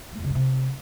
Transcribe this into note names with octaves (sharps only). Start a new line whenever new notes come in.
A3
E2
C#3
G2
C3